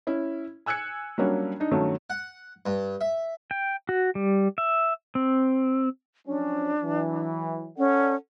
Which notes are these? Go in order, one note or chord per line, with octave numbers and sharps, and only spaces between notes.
C#4 E4
G#5 E6 F#6 G#6 C#7
F#3 G3 A#3 C#4 D4
D4 D#4
G2 D#3 F#3 A3 C#4
F#5
G2
E5
G5
F#4
G3
E5
C4
F3 F#3 C#4 D4
E3 F#3
C#4 A4 D5 F#5